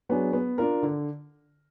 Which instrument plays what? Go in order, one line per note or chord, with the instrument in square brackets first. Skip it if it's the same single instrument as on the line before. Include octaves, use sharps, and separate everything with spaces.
[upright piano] F#3 B3 D4 G#4
B3
D4 F4 A#4
D3